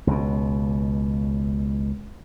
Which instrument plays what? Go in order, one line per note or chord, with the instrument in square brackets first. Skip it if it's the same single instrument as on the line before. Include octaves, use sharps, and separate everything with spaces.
[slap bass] C#2 B2